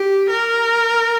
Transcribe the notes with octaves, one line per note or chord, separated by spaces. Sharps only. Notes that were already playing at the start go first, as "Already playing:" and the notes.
Already playing: G4
A#4